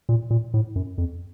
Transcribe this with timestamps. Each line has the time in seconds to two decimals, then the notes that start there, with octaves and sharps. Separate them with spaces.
0.09 A#2
0.30 A#2
0.54 A2
0.76 F#2
0.98 F2